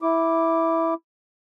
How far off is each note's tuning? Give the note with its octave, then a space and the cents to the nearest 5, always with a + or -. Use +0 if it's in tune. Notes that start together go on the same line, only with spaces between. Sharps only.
E4 -5 D6 +0